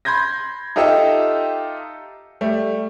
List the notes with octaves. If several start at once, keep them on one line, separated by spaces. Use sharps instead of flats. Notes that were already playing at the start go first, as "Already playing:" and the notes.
B5 C6 G6 G#6 A#6
D#4 F4 G4 A4 D#5 E5
G3 A3